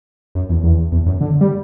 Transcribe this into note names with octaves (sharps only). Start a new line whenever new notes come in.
F#2
E2
E2
E2
F#2
D3
G3